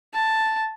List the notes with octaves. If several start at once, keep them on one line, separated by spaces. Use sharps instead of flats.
A5